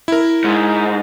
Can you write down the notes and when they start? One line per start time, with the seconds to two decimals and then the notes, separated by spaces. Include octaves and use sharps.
0.08 E4 A#4
0.44 G#2